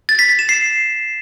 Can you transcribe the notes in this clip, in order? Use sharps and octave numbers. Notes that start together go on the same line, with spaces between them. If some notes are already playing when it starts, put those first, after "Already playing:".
A6
B6
A6
E7
C7